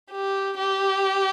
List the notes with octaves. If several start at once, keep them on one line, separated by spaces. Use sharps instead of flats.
G4
G4